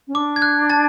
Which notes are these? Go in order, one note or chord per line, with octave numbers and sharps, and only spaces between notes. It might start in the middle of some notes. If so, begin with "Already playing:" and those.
C#4
D4 D6
G#6
F#6
A5 A6